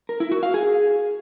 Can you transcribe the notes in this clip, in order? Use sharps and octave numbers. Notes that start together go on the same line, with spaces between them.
A#4
E4
F#4
F5
G#4